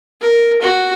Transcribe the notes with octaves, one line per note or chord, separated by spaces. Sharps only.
A#4
F#4